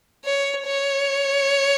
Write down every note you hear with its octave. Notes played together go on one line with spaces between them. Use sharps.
C#5
C#5